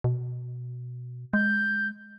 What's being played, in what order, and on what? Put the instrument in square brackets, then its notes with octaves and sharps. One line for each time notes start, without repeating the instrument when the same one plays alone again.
[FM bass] B2
[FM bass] G#3 [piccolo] G6